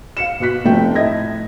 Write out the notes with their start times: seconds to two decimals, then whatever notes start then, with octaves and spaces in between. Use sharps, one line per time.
0.17 F5 C#7 E7
0.40 B2 F#4 F#6 B6
0.65 F1 F3 A3 G5
0.95 A2 E4 D#5 E5 G#6 A#6